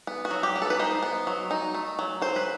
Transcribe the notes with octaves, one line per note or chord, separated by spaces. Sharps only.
B3
F#4
F#3
G4
B3
A4
B4
D#4 C5
B3
F#3
D#4
A3
F#3
F#3 C5
B4